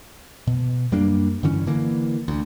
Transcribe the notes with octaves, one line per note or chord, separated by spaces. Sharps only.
B2
F#2 G3 A#3 D4
G2 D3 E3 C#4
D3 E3 A#3
D2